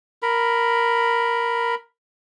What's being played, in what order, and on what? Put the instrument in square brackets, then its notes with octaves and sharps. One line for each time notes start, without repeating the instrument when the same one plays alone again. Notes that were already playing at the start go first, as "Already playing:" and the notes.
[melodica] A#4 B5